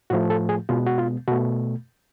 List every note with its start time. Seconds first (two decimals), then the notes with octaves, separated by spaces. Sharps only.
0.10 A2 F3 A3 F#4
0.30 A4
0.49 G#4
0.69 B2 G#3 B3 F4
0.86 F#4
0.98 F4
1.28 B2 A3 F#4